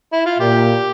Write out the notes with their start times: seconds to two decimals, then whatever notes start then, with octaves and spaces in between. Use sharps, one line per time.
0.13 E4
0.26 F4
0.39 A#2 G4